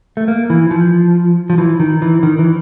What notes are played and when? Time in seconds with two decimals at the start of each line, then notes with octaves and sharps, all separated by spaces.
0.17 A3
0.28 A#3
0.50 E3
0.71 F3
1.50 F3
1.58 E3
1.80 D#3
2.02 E3
2.23 D#3
2.39 E3